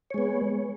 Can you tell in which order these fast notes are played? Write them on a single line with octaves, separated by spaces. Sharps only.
C#5 G#3 B3